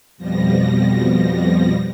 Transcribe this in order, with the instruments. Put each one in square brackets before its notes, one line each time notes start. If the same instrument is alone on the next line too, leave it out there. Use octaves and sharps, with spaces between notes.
[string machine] F2 B2 F3 G3 A#6